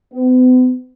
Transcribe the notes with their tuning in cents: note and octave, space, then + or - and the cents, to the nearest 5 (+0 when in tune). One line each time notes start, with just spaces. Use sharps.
B3 +45